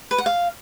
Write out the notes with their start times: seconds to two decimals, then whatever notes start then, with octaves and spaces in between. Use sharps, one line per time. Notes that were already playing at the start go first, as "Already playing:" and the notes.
0.11 B4
0.18 F#5
0.26 F5